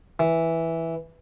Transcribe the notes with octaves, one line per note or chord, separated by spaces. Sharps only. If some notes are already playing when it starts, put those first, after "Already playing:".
E3